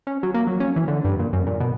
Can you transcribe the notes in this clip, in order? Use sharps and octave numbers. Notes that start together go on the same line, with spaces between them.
C#4
F#3
A#3
F#3
C#4
E3
D3
G2
A#2
F#2
A#2
B2